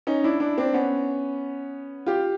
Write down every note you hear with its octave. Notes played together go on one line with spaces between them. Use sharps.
C#4 D#4
D4 E4
D4 E4
C4 D4
B3 C#4
F4 G4